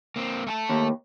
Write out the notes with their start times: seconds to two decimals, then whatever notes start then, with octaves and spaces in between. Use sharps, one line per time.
0.16 A#3 C4
0.47 A3 G#5 A5
0.69 D#2